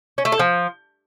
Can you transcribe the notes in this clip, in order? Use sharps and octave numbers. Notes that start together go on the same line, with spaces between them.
C#4
A3
A4
F3